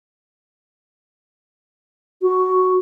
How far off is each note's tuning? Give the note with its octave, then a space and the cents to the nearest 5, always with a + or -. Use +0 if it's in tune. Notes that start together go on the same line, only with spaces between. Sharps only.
F#4 +5